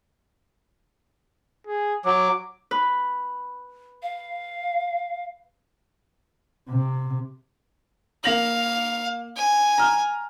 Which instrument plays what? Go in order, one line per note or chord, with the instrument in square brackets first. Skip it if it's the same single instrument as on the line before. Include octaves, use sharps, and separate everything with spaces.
[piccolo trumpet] G#4
[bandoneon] F#3 [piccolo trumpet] D6
[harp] B4
[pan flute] F5
[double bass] C3
[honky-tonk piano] A#3 A#6 F#7 [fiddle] F5
[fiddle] G#5
[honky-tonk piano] A#5 F6